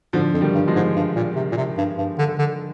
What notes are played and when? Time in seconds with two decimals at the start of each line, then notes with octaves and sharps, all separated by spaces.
0.13 G#2 D3 F3
0.33 F2
0.41 D#3 G3
0.54 G2
0.68 F3 G#3
0.75 G#2
0.96 G2
1.16 A#2
1.36 C3
1.52 A#2
1.57 C3
1.78 G2
1.98 G2
2.18 D3
2.38 D3